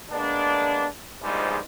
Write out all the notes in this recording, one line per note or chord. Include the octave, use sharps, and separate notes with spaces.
G#3 A#3 B3 D4
A#1 E2 G#2 F3 G3 G#3